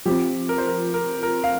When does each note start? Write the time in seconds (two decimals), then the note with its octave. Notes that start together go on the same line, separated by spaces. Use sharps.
0.05 F3 C4 F4 G4
0.49 A#4
0.58 C5
0.67 A#4
0.94 A#4
1.23 A#4
1.44 F5